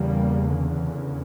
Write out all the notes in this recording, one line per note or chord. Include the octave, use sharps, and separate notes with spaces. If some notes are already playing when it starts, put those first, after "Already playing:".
Already playing: E2 C#3 G3 A#3
D3